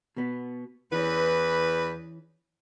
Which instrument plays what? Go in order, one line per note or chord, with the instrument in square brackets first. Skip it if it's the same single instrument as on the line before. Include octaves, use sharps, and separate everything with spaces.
[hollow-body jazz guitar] B2 B3
[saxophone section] E2 B4 [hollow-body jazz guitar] E3 C#4